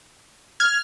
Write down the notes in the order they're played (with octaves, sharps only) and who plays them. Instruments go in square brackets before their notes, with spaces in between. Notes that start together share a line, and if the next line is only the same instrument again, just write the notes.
[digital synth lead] F6 [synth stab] G#6